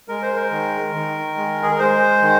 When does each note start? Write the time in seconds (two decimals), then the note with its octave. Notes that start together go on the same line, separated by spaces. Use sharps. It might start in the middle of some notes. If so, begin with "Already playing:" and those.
0.09 G#3 A#4
0.22 C5
0.36 A#4
0.51 D#3
0.94 D#3
1.37 G#3
1.63 G#4
1.71 A#4
1.79 G#3 C5
2.22 D#3